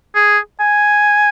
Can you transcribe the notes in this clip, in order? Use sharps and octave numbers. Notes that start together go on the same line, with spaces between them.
G#4
G#5